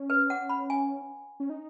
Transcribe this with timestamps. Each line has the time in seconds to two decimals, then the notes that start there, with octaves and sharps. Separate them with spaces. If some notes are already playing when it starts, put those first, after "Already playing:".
Already playing: C#4
0.10 B4
0.30 F#5
0.50 B5
0.70 G#5
1.40 C#4
1.50 D#4